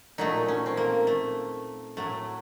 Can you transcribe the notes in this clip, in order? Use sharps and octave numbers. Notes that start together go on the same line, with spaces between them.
A#2 F#3 A3 D#4
C#4
C4
A#3
A3
A2 F#3 A3